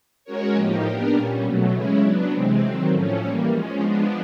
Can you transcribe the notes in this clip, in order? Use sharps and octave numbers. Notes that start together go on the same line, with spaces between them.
G#3 C#4 F#4 A#4 C#5
A2 F3 A#3 D#4 G4
B3 D4 G4 A#4
A#2 G3 A#3 C#4
B2 F#3 A3
C#3 E3 G#3 C#4 E4
F#3 B3 D4
C3 E3 G#3 C4
D#3 F#3 A3 C4
A2 F3 A3 C#4
E3 G3 A#3 C#4
F3 G#3 C#4
F3 G#3 B3 D4